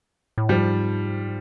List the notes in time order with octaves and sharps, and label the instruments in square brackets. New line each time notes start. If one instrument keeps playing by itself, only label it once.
[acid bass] A2
[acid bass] G#2 [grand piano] F3 G3